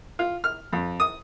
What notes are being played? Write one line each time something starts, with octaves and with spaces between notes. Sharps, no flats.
F4
F6
F2
D#6